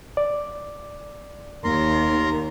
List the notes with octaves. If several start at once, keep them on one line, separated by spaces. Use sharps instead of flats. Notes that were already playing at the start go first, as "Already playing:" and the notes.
D5
D#2 A#4 A#5 C6